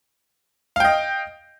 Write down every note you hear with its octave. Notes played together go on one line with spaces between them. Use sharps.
D#5 F5 G5